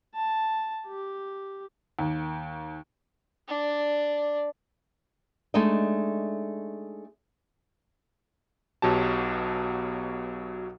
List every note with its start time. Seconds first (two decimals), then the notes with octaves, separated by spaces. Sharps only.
0.15 A5
0.87 G4
1.99 D#2
3.48 D4 D5
5.54 G#3 A3 D4 D#4 D#5
8.82 B1 B2 F#3 G4 A5